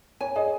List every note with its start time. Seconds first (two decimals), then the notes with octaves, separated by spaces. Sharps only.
0.21 C#5 G#5
0.36 G#4 D#5